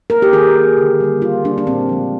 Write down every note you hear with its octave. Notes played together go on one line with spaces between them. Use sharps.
A#3 A#4
G4
D#3 G#4
A#3
D3
G3 A#3
D3 F4
G3 A#3 D4
D4
A#2 C4
F3 G#3